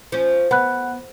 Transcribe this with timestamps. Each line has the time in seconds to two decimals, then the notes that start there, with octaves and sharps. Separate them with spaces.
0.12 F3 C#4
0.51 B3 F#5 B5 F#6